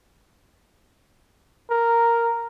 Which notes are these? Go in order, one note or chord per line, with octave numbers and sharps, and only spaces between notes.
A#4